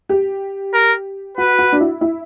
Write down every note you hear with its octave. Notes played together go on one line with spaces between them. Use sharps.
G4
A#4
F#4 B4
F#4
D4
E4
E4